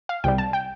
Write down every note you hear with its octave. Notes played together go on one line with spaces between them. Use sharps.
F5
C2 C3 G3 G5
A5
G5